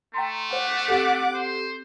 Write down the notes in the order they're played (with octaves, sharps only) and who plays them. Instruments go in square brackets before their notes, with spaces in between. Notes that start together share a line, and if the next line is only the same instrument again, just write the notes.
[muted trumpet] A3 [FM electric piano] G5 A#5 C6
[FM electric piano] C5 [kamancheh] F#5 D6
[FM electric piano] C4 G4 A4
[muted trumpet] C5